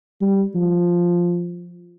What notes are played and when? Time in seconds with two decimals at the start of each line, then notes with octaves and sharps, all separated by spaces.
0.21 G3
0.55 F3